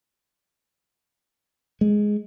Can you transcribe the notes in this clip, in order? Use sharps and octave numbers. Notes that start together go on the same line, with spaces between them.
G#3